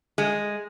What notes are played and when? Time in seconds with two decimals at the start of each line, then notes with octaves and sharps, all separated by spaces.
0.18 G#3